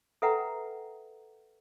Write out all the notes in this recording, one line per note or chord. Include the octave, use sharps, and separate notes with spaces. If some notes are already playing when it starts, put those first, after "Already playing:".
A4 B4 E5 F#5 G5 A#5